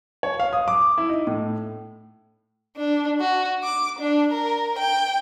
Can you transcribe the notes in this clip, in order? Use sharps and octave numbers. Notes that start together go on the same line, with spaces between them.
C#5
F5
D#6
D6
E4
D#4
A2
D4
F#4
D6
D4
A#4
G5